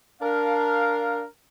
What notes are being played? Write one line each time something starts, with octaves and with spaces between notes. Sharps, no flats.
D4 A#4 F5